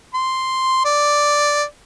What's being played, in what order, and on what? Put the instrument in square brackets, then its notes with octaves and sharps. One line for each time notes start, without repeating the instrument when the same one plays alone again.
[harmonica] C6
D5